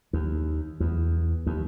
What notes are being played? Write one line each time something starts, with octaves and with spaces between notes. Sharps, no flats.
D#2
E2
D#2